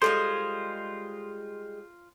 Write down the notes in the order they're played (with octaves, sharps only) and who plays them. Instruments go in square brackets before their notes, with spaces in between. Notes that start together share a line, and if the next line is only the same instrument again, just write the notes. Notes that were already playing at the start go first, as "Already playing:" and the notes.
[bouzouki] G3 G#3 G#4 [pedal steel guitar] F4 C5 [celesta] A4 C6